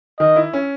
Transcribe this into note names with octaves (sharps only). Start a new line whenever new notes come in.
D#3 D#5
E4
C#4